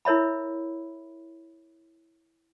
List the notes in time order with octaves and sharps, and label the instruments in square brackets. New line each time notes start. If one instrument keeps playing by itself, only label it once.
[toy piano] E4 A#4 C#5 E5 B5